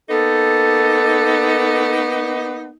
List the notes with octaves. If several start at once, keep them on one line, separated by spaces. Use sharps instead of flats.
A#3 B3 D#4 A4